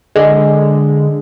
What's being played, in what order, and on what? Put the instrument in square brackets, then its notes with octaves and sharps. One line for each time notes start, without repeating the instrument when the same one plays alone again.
[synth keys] D3 G#3